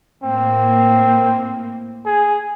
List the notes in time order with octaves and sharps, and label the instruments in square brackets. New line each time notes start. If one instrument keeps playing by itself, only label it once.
[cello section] A2 A#3 [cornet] C4
[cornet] G#4